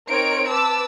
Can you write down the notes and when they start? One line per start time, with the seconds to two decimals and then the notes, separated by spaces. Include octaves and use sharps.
0.11 C4 D#4 A#4 C#5 D7
0.52 B4 A5 D6 E6